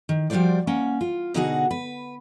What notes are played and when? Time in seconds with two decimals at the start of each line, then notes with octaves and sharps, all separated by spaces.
0.09 D#3
0.30 F3 G3 A3 F#4 C5 D5
0.67 A#3 C#4 F#5
1.01 F4
1.34 B2 D3 D#4 F#4 G#4 F#5
1.71 B4